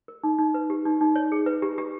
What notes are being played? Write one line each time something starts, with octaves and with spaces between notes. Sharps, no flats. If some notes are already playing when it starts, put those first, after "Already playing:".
A#4
D#4
D#4
B4
G4
D#4
D#4
C#5
G#4
B4
G4
G4